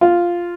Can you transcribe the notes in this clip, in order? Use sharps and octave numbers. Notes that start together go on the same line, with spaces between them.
F4